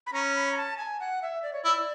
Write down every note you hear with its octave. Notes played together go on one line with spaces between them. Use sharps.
B5
C#4 A#5
B5
A#5
A5
G#5
F#5
E5
D5
C#5
E4 D5